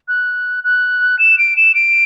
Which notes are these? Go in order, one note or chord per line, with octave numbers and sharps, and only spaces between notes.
F#6
F#6
E7
D7
E7
D7